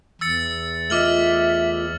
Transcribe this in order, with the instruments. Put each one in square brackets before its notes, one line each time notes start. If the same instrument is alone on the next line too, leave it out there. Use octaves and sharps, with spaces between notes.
[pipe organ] E2 [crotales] E6 A6 C#7
[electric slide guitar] A3 F4 D#5 [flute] E5 [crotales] D6 F6 F#7